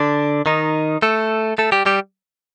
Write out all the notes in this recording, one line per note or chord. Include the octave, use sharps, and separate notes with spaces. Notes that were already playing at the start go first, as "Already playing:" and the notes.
Already playing: D3 D4
D#3 D#4
A3 A4
A3 A4
G3 G4
G3 G4